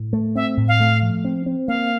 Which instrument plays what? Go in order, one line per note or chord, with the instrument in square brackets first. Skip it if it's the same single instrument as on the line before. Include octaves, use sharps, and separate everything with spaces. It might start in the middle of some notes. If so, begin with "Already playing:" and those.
Already playing: [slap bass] A2
A3
[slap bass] C4 [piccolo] E5
[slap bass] A2
[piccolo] F5
[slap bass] A3
F3
C4
C4
[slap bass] A#3 [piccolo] F5